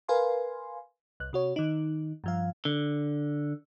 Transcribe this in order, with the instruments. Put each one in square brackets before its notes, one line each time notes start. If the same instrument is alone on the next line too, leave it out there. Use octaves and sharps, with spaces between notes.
[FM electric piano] A#4 B4 F5 G#5 C6
C2 F#6
C3 F#4 C#5
D#3 D#4
G2 F3 F5
[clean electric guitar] D3